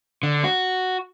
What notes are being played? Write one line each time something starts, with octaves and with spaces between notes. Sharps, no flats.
D3
F#4